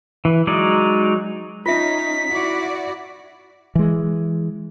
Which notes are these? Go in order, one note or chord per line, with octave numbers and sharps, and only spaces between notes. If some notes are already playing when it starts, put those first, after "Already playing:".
E3
F#3 G#3 D#4 D5
C#4 D#4 F4 E5 B6
E4 F#4 D5
E3 G#3